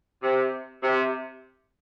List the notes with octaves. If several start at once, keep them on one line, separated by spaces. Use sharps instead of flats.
C3
C3